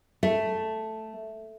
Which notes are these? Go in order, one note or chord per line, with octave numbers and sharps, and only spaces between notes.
A3